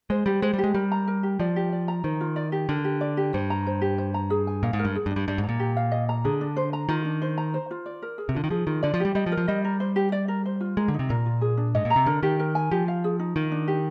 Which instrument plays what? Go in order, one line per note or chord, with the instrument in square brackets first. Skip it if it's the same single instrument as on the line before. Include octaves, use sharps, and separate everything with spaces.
[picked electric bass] G#3 [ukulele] C5
[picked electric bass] G3 [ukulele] G4
[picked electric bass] G#3 [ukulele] C5
[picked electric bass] G3
[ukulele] G4
[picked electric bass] G#3
[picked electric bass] G3 [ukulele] A#4
[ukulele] A#5
A#4
G4
[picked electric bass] F3 [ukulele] D5
[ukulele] G4
D5
A#5
[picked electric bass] D#3 [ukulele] C5
[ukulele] F4
D5
G4
[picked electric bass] D3 [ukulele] A#4
[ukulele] G4
D5
G4
[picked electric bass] G2 [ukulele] C5
[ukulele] A#5
C5
G4
C5
A#5
G#4
G#5
[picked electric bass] A#2 [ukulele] F5
[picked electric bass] G#2
[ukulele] A#4
[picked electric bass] G2
[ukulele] G#4
[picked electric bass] G2
[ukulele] D4
[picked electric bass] G2
[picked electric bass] G2 [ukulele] D5
[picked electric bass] G#2
[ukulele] A#5
[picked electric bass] A#2
[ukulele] G4
F5
D#5
A#5
[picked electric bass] D3 [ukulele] G#4
[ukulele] D4
C5
A#5
[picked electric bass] D#3 [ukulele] F4
[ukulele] D4
C5
A#5
C5
F4
D5
A#4
G#4
[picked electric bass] C3
[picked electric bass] D3 [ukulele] F4
[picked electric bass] D#3
[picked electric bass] F3 [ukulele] G#4
[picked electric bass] D#3 [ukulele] F4
[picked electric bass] D3 [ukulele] D5
[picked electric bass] F3
[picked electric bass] G3 [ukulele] G4
[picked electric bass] G3 [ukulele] D#5
[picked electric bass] F3
[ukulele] A#4
[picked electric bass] F3
[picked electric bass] G3 [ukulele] D#5
[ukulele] A#4
C5
G4
D5
A#4
C5
F4
[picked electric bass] G#3 [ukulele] A#4
[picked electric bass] D3
[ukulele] D#4
[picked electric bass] C3
[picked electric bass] A#2 [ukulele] A#4
[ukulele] F4
G#4
D4
[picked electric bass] G#2 [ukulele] D#5
[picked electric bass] A#2
[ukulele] A#5
[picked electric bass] C3
[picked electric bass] D3 [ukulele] A#4
[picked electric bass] D#3 [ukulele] G4
[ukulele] A#4
G#5
[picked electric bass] F3 [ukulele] G4
[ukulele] F5
G#4
D#4
[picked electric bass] D#3 [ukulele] F4
[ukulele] D4
G4